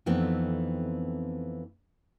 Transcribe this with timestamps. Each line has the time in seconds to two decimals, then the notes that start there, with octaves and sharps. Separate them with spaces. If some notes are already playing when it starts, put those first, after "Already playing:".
0.06 F2 E3 A3 B3 C4 D#4